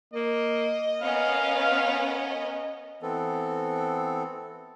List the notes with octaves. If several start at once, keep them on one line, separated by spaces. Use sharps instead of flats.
A#3 D#5
B3 C#4 A#4 F5
E3 B3 C4 A4